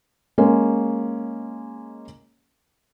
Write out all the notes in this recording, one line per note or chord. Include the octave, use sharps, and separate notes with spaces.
G#3 A#3 C#4 C#5